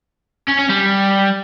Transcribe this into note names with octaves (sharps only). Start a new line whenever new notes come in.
C#4
C#4
G3